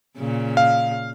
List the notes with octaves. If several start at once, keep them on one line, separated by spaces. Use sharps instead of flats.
A#2 C#3
F5